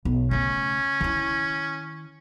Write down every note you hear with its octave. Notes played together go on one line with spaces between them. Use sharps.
B1
C#3 A3 C#4
D#3 E4